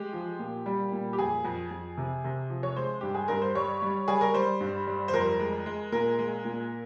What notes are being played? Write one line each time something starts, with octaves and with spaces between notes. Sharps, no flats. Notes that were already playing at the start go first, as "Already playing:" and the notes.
Already playing: G#3 G4
F3
A#2
G3
A#2
G4
F2 G#4
F2
F2
C3
C3
F3
C#5
G#3 C5
G2 G4
G#4
G2 A#4
C5
G3 C#5
G3
G3 G#4
A#4
G3 C5
G2
G3
C5
F2 A#4
G#3
G#3
A#2 A#4
G#3
A#2